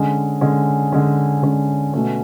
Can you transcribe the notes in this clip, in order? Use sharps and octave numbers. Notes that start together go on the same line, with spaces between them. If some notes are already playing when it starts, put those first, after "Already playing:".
Already playing: D3 G#3 C#4
D3 G#3 C#4
D3 G#3 C#4
D3 G#3 C#4
B2 A3 C#4